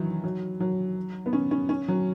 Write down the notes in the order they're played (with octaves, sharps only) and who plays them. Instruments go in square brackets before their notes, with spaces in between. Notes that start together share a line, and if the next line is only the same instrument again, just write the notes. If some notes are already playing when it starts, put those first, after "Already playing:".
Already playing: [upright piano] D#3 E3 F#3
F#3
F#3
B3
C#4
C#4
C#4
F#3